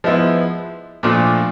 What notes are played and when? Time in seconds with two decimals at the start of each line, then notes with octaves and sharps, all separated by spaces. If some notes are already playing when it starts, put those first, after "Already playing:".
0.04 F3 G#3 B3 E4
1.03 A#2 F3 A3 D4 F4